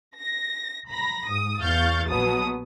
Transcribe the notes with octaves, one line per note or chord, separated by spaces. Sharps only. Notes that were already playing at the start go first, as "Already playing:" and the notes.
A#6
A#5 B5 A#6
G#2 D#6
E2 F5 C#6 F6 G6 A6
A#1 B2 F#3 B3 D#6